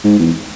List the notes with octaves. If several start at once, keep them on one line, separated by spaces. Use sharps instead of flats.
G#2
E2